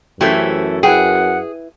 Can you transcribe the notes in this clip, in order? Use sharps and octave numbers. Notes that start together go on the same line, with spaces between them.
F#2 E3 A3 C#4 G4 C5 E5
E4 G#4 B4 F#5 G5